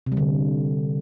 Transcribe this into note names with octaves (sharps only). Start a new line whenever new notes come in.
C3
G3
D3